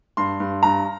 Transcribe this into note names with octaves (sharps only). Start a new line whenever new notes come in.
G2 C6
G2
G2 A#5